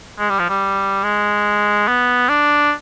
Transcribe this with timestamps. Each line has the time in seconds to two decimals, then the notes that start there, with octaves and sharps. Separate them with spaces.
0.19 G#3
0.30 G3
0.39 F3
0.49 G3
1.04 G#3
1.88 B3
2.29 D4